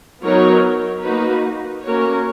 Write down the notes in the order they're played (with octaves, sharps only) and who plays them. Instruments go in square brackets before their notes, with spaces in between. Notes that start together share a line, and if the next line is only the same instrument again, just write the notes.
[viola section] F#3 B3 D#4 A#4 C#5
A#3 D#4 F#4 B4
A#3 C#4 F#4 A#4 C#5